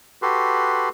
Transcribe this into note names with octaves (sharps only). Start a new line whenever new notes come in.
F#4 G4 A4 B4 C6